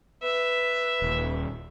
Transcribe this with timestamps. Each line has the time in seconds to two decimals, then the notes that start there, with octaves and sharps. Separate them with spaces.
0.23 B4 E5
1.02 D#1